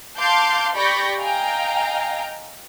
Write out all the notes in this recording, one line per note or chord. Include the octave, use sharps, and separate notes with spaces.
F5 A5 C6 D6 G6 C7
G4 D5 B5 C#6 G6 A#6
D#5 F5 G5 G#5 A#5